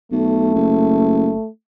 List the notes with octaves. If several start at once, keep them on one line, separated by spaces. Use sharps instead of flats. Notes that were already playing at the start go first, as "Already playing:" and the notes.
B1 A3
F#1